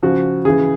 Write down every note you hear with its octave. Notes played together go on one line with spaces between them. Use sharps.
C#3 F3 F#4
C#3 E3 G#4